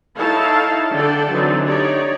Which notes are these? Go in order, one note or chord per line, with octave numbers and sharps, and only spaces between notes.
D#4 E4 A4 C#5 F5 A5
D3 A4 D5 G5 A5
D3 E3 F#3 C4 D#4
D#4 G4 C#5 D5